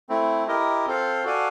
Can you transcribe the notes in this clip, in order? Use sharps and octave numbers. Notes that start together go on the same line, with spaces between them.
A3 C4 E4
E4 G4 A#4 D#5
C4 F4 A4 C5 F5
F#4 A4 D5 F5 G#5